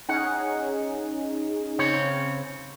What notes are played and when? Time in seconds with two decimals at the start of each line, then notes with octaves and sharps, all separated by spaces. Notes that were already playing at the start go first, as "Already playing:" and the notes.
0.09 C#4 D#4 G#4 F#5
1.79 C#3 C4 C#5